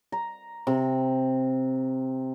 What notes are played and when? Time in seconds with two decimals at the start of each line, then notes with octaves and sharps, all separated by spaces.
0.12 A#5
0.67 C3